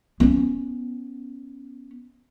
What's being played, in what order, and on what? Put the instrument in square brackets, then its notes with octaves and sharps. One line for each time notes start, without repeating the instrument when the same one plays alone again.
[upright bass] B3 C#4